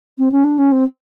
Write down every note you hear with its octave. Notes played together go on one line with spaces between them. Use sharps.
C4
C#4
D4
C#4
C4